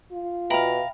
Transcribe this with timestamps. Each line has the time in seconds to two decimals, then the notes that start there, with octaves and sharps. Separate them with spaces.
0.12 F4
0.50 B2 E5 F5 G5 A#5 B5